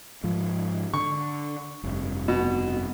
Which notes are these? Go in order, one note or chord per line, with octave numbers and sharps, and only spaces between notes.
G#2 F3
D3 C#6
F1 G2
B2